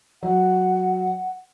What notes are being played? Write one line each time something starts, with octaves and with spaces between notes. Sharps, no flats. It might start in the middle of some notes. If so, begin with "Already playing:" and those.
F#3 F#5